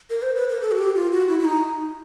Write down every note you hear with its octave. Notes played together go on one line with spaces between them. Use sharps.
A#4
C5
B4
A#4
A4
F#4
G4
F4
F#4
E4
E4
D#4